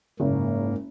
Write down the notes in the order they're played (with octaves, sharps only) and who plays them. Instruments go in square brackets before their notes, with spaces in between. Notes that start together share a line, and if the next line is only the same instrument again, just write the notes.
[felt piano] F#1 [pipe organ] G#2 A#3